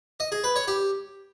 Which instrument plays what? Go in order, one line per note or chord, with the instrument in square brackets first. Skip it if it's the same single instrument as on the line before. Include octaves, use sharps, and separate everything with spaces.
[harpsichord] D#5
G#4
B4
C#5
G4